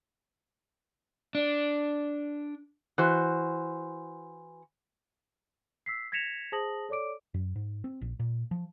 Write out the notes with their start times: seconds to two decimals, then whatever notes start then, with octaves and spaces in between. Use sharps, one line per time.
1.35 D4
2.98 E3 F#4 C5
5.86 E6 B6 C7
6.12 G#6 A#6 B6 C#7 E7 F7
6.52 G#4 C5 A5 D#6 A#6 F#7
6.89 A4 C#5 D5 D6 D7
7.34 F#2
7.56 G#2
7.84 C4
8.01 A#1
8.19 A#2
8.51 F3